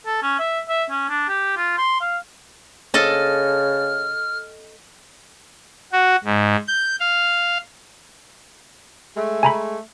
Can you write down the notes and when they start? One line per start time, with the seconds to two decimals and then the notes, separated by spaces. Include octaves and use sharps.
0.06 A4
0.22 C#4
0.39 E5
0.69 E5
0.90 C#4
1.09 D4
1.29 G4
1.57 F4
1.78 C6
2.01 F5
2.94 C#3 A4 D#5 A5 F6
5.92 F#4
6.24 G#2
6.68 G6
7.00 F5
9.16 G#3 A3
9.43 G#5 A#5 B5